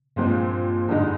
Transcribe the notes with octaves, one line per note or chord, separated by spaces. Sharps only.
G2 A#2 F3 G#3 C4
F2 G#2 D3 G#3 D#4